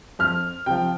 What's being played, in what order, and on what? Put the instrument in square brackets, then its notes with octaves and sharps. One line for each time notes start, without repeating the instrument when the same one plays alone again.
[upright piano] F2 F6
C3 F3 G5